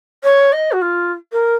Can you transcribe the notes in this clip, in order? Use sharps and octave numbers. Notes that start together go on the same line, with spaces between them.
C#5
D#5
F#4
F4
A#4